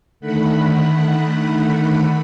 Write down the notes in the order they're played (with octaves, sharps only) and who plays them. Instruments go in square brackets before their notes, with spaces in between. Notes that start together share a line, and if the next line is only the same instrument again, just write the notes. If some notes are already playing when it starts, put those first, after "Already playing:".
[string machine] D3 D#3 A3 F#5 B5